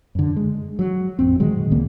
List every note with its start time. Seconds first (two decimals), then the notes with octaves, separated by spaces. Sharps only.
0.15 F#2 D3
0.36 G#3
0.79 F#3
1.19 A1 F2 C4
1.40 A#2 D#3 F#3 G#3
1.71 C#2 A#2 A#3 B3